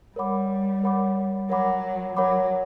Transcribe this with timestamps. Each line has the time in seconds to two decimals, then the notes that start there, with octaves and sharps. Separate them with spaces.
0.16 G3 A#4 C#5 F#5 B5 D6
0.83 A#4 C#5 F#5 B5 D6
1.50 F#3 A#4 C#5 F#5 B5 D6
2.16 F#3 A#4 C#5 F#5 B5 D6